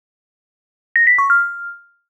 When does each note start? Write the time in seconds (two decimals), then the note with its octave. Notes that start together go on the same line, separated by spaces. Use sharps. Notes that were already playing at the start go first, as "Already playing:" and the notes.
0.96 A#6
1.07 B6
1.18 C#6
1.30 F6